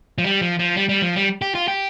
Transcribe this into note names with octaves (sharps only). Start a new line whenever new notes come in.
F3
G3
F3
F3
G3
G3
F3
G3
G4
F4
G4